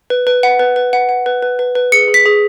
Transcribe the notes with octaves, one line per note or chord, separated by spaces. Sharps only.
B4
B4
F#5
B4
B4
F#5
F#5
B4
B4
B4
B4
G#4 C#7
G#4
B6
G#4